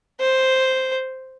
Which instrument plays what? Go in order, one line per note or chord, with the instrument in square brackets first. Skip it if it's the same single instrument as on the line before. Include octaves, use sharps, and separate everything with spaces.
[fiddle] C5